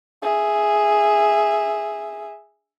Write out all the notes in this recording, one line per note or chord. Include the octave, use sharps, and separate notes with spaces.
G#4 E5